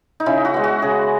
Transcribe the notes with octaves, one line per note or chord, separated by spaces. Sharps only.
D#4
C#3 E4
F#4
G#3 B3
F#4
C#3 G#4